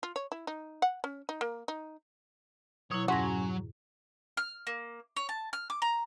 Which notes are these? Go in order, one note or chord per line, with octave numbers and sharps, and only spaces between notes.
F4
C#5
E4
D#4
F#5
C#4
D#4
A#3
D#4
B2 F#3 E4 C#5
F2 G#2 F#3 C#4 F#4 A#6
F6
A#3
C#5
A5
F6
D6
A#5